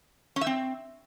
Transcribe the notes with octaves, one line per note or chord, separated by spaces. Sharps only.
C#4
E5
C4